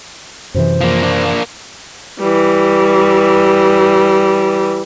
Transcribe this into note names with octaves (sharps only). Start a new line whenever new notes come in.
F#2 C3 E3 C5
F3 A#3
A#3 D4
E3 G3